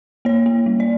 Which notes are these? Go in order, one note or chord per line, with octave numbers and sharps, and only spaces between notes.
A#3 C#5
A#3
G3
D5